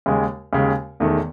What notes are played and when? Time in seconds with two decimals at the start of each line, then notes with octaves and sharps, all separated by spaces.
0.06 D#2 C#3 G#3
0.53 D#2 C#3 G#3
1.00 E1 E2 D#3 A3